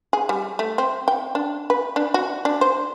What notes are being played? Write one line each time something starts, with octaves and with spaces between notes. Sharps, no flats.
G#4
G3
A3
C4
G5
D4
B4
D4
F#4
D4
C5